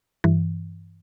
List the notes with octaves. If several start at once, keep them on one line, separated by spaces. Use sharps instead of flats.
G2 E3